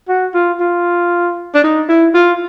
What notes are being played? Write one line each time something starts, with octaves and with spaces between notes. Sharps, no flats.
F#4
F4
F4
D4
D#4
E4
F4